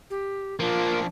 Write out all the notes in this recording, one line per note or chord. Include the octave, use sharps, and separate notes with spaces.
G4
F3 A#3 D4 F4